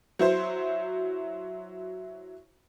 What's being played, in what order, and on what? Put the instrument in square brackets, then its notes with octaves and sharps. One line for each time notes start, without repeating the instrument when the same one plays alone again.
[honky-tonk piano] F#3 E4 C5